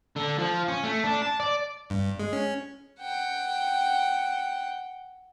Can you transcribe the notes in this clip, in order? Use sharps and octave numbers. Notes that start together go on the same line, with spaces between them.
D3
F3
C#4
A3
D4
A5
D5
G2
G#3
C#4
F#5 G5